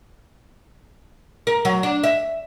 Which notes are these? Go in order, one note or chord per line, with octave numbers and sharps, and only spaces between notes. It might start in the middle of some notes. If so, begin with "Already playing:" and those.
A#4
F#3
D4
E5